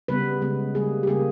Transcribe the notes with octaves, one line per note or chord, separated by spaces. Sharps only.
C#3 G3 B3 B4
C#3 G#3 B3
C#3 G3 A#3 G#4
G4
C#3 G3 A#3 G#4